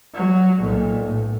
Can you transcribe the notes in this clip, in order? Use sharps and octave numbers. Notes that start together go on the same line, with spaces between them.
F#3
B1 A#2
A2